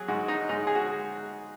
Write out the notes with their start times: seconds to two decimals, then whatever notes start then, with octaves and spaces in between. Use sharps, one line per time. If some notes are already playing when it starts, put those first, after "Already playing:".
Already playing: F#3 G#4
0.08 G#2 F#4
0.28 D#4
0.49 G#2 D#4
0.67 G#4
0.75 F#4